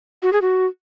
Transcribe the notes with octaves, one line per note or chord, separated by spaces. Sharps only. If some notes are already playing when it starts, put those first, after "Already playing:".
F#4
G#4
F#4